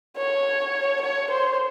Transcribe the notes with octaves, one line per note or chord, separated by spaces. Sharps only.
C#5
C#5
C5